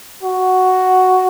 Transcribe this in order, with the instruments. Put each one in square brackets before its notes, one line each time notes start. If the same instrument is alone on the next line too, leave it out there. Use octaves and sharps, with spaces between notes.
[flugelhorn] F#4